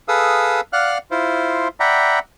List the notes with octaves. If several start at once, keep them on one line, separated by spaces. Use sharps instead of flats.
G#4 A4 B4 F5 D#6 E6
D5 F5 F#5 F6 F#6
E4 F4 C5
D5 E5 F#5 G5 A#5 B5